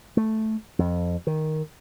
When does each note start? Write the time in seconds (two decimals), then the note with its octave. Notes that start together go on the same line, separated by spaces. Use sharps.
0.17 A3
0.79 F2
1.27 D#3